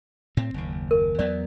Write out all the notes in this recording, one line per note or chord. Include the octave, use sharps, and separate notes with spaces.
A2 C4
F#1 D#2
A#4
E2 F#3 B3 D5